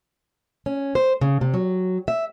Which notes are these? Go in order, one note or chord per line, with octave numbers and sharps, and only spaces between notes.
C#4
C5
C#3
C3
F#3
E5